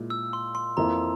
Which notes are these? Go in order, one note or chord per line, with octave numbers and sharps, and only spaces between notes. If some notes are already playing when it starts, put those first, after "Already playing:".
Already playing: A#2 G#3 E4
E6
C6
C6
F2 E3 A#3 E4 A#5